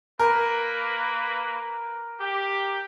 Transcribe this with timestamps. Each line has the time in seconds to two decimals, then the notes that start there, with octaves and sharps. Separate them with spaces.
0.19 A#3 A#4 B4
2.20 G4